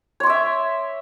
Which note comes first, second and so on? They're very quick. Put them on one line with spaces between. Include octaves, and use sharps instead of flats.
C#5 C6 D6 E5